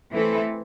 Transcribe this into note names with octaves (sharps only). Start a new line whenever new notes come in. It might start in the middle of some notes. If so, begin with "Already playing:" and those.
E3 A3 C4 E4 A4